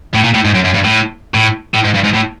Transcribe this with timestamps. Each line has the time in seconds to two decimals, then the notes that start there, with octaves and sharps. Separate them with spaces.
0.15 A2
0.24 A#2
0.35 A2
0.45 G#2
0.54 F#2
0.64 F#2
0.74 G2
0.84 A2
1.34 A2
1.74 A2
1.84 G#2
1.94 G2
2.04 G#2
2.14 A2